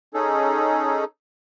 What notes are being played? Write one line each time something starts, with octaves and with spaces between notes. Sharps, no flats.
C#4 D#4 G#4 A4